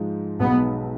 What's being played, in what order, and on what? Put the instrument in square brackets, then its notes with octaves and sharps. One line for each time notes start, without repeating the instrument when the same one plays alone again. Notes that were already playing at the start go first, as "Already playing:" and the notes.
Already playing: [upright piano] G#2 F3 G#3 D#4
[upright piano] B1 B2 G#3 D#4 [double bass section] B3